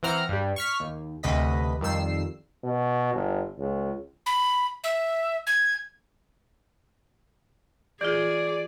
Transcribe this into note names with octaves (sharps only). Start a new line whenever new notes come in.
E3 C4 F#5 A#5 F6
G2 G3
C#6 F6 B6
D#2
D2 C3 B4 D#5 B6
F2 D#3 G3 E6 C7
B2
G1
C#2
B5
E5
G#6
E3 F4 G#4 D5